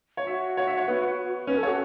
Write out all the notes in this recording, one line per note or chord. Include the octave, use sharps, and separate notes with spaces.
C#5
F#4 E5
C#5
E5
C#5
B3
C#4 B4
A4
C#5
F#4